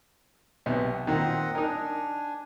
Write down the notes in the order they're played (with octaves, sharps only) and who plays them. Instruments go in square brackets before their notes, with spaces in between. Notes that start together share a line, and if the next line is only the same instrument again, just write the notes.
[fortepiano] B1 C3 B3
[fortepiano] A#2 D#3 [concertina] C4 D#5 F#5
[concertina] D4 G#5 [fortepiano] D#4 A#4